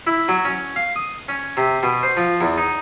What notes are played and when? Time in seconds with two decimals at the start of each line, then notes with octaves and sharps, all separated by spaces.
0.07 E4
0.28 F#3
0.45 C#4
0.76 F5
0.96 D#6
1.28 C#4
1.57 C3
1.83 B2
2.03 C5
2.17 F3
2.41 E2
2.58 D#4